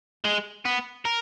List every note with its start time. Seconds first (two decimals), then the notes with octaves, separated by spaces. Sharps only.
0.25 G#3
0.65 B3
1.05 A#4